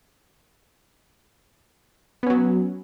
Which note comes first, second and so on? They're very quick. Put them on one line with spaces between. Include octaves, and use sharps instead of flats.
B3 C#4 F#3